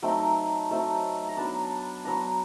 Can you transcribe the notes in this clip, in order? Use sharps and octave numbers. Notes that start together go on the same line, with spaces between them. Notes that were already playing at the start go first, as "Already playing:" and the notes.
F#3 A3 C4 D#4 G5
F#3 A3 C4 D#4
A#5
F#3 B3 D4 A5
F#3 B3 D4 A#5